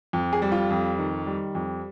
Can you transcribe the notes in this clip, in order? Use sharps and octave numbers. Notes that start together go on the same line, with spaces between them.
F2
G#4
G3
F4
F2
D#3
G3
F2